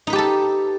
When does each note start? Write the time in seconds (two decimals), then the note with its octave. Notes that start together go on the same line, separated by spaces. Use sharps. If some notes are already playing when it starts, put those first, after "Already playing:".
0.07 D#4
0.10 B4
0.13 G4
0.16 A5
0.18 A4